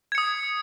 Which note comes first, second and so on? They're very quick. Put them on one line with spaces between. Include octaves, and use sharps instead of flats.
G#6 C#7 D#6